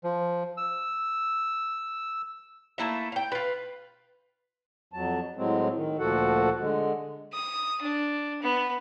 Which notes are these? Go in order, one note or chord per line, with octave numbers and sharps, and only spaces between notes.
F3
E6
A3 A#3 E4 E5
F5 G5
F4 B4
F2 F#3 A5
A2 F#3 G#3 C4
D#3
D2 A#2 F3 F#4 A4 F#5
D3 G#3
D#6
D4
B3